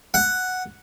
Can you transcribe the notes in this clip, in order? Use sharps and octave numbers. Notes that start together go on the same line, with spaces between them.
F#5